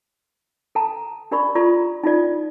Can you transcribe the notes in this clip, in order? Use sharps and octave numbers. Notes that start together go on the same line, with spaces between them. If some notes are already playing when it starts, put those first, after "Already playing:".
A4 A5 A#5
D4 G4 A#4 D5 B5 C#6
F4 A4 D5 A#5 C6 C#6
D#4 F4 A4 D5